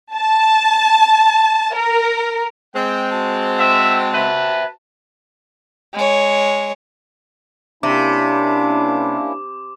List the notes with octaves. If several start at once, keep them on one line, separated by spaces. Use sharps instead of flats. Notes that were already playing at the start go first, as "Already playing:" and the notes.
A5
A#4
G#3 C4 G5
F#4 A5
E5 F#5 G5
B4 C5 E5
G#3 C#5
C3 A#3 C#4 D4 E4 D6